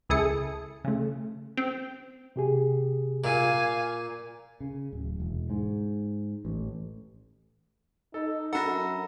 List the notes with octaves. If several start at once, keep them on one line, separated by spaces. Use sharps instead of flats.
C#2 E4 G#4 A4 D#6 C#7
C#3 A3
C4
C3 G4 G#4
A#2 F5 G#5
C#3
D1
E1
G#2
A1
D#4 A4
F#2 D4 A4 F#5 A#5 B5 A#6